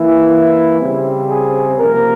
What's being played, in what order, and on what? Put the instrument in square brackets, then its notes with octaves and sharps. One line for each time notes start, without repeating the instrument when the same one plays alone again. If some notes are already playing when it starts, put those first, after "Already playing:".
Already playing: [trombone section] E3 A#3 E4
C#3 G3 C4
G#4
C3 F3 A#3 A#4